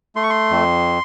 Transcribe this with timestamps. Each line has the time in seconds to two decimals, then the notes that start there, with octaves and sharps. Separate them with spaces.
0.16 A3 C6
0.23 C#6
0.30 C6
0.51 F2